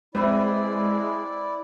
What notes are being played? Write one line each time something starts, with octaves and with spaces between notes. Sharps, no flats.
G#3 C4 E4 B4 D5 E5